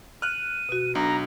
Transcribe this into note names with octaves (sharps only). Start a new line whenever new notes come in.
F6 F#6 D#7
B2 F#4
B1 D4 A#5